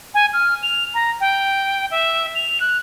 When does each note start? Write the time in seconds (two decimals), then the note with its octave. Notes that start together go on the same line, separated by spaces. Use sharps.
0.14 G#5
0.33 F6
0.62 F7
0.94 A#5
1.20 G5
1.91 E5
2.35 F7
2.60 F#6